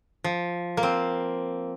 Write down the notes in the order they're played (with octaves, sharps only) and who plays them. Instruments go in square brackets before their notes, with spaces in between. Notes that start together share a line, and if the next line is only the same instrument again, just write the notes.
[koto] F3
A#3
C4